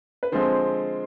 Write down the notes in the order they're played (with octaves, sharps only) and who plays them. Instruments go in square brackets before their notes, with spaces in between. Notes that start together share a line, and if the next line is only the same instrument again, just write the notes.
[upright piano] B4
D3 F3 G#3 C4 C5